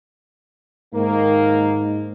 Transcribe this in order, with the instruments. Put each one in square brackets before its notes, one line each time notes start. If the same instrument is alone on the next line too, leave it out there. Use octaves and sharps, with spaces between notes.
[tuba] G#2 [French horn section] D#3 A#3